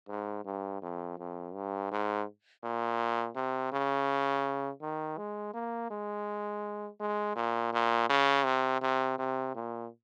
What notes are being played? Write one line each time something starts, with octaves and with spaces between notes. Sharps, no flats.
G#2
G2
F2
F2
G2
G#2
A#2
C3
C#3
D#3
G#3
A#3
G#3
G#3
A#2
A#2
C#3
C3
C3
C3
A#2